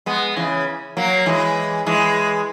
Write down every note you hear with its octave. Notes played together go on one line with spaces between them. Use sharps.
G#3 B3
C#3 E3
F#3 A#3
E3 G#3
E3 G#3